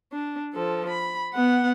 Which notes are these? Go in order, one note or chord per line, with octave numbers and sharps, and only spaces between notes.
D4
F3 A4
B5
B3 F#5